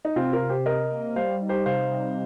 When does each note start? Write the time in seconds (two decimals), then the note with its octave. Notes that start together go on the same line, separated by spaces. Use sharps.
0.05 D#4
0.16 C3 C4 F4
0.33 F4 A#4
0.42 C3
0.49 G4 C5
0.66 C3 A#4 D#5
0.91 A#3
1.16 G3 C5 F5
1.41 D#4
1.49 G4 C5
1.66 C3 C5 F5
1.91 C3